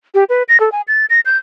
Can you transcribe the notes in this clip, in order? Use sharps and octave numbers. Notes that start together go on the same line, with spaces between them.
G4
B4
A#6
A4
G#5
A6
A#6
G6